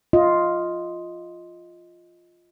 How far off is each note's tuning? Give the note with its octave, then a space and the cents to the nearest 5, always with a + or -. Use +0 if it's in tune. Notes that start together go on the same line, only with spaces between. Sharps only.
F4 +0 D#5 +10